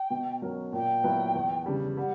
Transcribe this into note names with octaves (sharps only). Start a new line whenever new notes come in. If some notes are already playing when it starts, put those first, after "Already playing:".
Already playing: G5
B2
F#3 C#4 F#4 A#4
A#2 G5
F#3 B3 E4 B4
E2
C#3 G3
G3 F#5